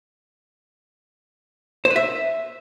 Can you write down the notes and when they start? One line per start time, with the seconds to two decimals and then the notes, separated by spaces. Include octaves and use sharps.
1.85 C5
1.90 B4
1.96 E5